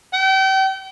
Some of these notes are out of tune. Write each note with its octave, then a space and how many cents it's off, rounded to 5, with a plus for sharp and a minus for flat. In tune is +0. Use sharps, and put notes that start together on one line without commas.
G5 -35